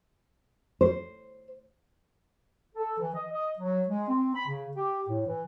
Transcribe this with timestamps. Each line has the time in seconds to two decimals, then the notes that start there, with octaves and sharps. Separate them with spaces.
0.81 C5
2.75 A4
2.99 E3
3.14 D#5
3.32 D#5
3.59 F#3
3.88 G#3
4.08 C4
4.35 B5
4.48 C#3
4.77 G4
5.09 A2
5.26 E3